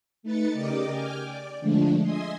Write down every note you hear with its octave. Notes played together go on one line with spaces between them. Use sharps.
A3 D#4 B4 A6 C#7
C#3 G4 A#4 D5 D#5 D6
G5 G#5 D6 F6
D5
D3 F3 G#3 A3 D4
D#5 E5 G#5 C6 D#6